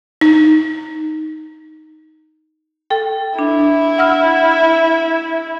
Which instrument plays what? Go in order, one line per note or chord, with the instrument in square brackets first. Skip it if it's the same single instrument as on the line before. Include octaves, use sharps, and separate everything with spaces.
[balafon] D#4
[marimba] A4 G5
[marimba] D4 [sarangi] E4
[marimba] F#5 E6 F6